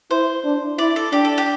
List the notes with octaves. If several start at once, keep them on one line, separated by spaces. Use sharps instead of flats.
E4 C5
D4
E4 D5
A4
D4 G4
A4
G4